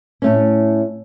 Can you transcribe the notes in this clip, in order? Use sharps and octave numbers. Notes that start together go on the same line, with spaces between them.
A2 A3 C#4